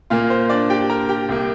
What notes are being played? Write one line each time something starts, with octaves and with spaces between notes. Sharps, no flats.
A#2 A#3 F4 F5
C5
D4 D5
G4 G5
A#4 A#5
G4 G5
C2 C3 A#3